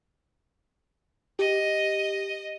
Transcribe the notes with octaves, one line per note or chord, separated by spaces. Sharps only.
G4 D#5